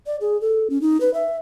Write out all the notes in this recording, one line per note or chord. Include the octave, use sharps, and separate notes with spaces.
D5
G#4
A4
C#4
D#4
B4
E5